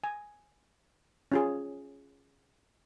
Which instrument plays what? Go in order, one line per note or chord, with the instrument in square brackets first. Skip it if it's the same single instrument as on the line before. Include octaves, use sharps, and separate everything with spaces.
[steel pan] G#5
C#4 F4 G#4